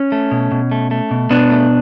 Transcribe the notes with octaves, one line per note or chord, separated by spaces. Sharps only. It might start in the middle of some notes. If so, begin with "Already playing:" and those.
Already playing: C#4
A3
B2
B2
A3
A3
B2
B2 B3 D4
A3